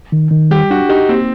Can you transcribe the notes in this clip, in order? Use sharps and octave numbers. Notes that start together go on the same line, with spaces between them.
D#3
D#3
G3 G4
D4 F#4
D#4 G4
A#3 C4